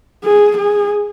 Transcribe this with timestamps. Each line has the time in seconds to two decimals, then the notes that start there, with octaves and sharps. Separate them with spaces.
0.24 G#4
0.58 G#4